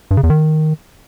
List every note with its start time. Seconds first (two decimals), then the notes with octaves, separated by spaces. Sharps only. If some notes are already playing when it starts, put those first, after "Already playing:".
0.11 G2
0.17 C#3
0.23 E2
0.30 D#3